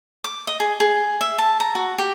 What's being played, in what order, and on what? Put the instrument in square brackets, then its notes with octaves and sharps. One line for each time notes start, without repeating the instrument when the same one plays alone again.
[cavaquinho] D6
D#5
G#4
G#4
E5
A5
A#5
F#4
G4